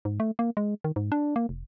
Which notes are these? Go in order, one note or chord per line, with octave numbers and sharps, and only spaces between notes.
G#2
A3
A#3
G#3
D#3
G#2
D4
A#3
F1